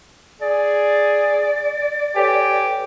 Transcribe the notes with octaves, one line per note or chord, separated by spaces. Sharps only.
G#4 D5
G4 A4 B4 C#5 G#5